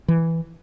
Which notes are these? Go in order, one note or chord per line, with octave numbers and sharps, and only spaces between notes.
E3